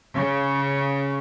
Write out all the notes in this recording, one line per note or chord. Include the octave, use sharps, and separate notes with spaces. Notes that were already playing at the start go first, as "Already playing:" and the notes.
C#3